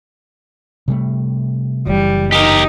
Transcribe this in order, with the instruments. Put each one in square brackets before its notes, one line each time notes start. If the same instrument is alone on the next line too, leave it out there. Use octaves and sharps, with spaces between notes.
[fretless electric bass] C3 G3 A3
[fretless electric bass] F#1 E3 [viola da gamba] G3
[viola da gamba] D#4 [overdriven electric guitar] G4 A#4